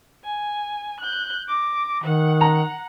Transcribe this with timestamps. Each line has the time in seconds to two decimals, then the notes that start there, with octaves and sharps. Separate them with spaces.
0.24 G#5
1.00 F#6 G6
1.48 D6 A#6
2.04 D#3 F#5
2.41 A#5